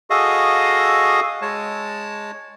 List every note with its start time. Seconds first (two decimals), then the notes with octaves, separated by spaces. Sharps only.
0.10 F#4 G#4 A4 D#5 F5 D#6
1.42 G#3 C#5 A5